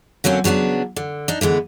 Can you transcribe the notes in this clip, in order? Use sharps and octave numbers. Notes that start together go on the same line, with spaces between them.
D3 F#3 A#3 C4 C#4
C#3 F#3 B3 C#4 D4
D3
D4 D#4
D3 E3 G#3 B3